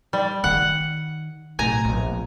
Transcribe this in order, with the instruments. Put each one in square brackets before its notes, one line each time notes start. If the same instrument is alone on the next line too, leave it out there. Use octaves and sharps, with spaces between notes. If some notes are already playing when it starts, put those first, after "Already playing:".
[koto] G3
[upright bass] D#3 D#4 [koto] F#5
[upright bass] B1 A2 [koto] G#5 A#5
[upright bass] A#1 B3